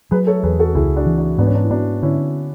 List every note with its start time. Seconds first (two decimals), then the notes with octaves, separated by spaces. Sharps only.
0.11 F#3 G#4 B4
0.27 A4 C#5
0.43 E2 G#4 B4
0.59 F#4 A4
0.75 C#2 E4 G#4
0.96 D4 F#4
1.06 E3
1.18 D4 F#4
1.38 G#2 B3 D4
1.47 C#4
1.55 D4
1.63 E4
1.71 B3 D4 F#4
2.02 D3 C#4 E4